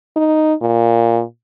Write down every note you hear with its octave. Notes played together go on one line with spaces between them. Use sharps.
D#4
A#2